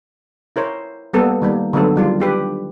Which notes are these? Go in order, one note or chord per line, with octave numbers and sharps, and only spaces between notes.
E4 A#4 C5 C#5
G3 A#3 B3 A4
D#3 G3 A#3
D3 F#3 A3 B3 A4 C5
D#3 G3 F4
D4 G4 B4